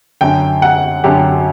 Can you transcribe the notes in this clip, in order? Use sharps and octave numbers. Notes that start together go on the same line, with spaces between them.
F#2 D3 G5
F#5
F#2 D3 G4